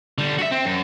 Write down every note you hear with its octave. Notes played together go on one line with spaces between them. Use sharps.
D3 G3
F#4 E5
C4
F#2